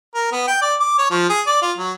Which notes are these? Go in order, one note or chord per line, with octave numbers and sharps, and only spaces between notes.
A#4
B3
G5
D5
D6
C#5
F3
G#4
D5
F4
F#3